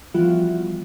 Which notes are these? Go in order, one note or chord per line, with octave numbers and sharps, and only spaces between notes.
E3 F3 G3 B3 F4 F#4